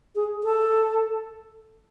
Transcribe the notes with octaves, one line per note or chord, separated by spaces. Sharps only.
G#4
A4